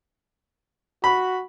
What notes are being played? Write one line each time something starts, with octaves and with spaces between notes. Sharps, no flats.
F#4 B5